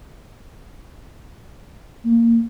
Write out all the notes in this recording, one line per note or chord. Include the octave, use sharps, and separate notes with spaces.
A#3